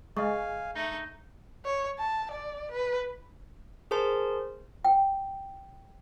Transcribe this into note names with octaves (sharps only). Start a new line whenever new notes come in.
G#3 D#5 F5 G#5 C#6
A3 D#4 G6
C#5
A5
D5
B4
G#4 A#4 C5 A5 C6
G5